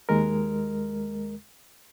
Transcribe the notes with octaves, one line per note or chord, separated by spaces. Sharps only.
D#2 G#3 A#4